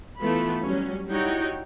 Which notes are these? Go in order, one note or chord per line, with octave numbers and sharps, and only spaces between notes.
E3 A3 B3 F4 A4 B5
F#3 G3 C#4
G3 D#4 E4 F#4 C#5 G5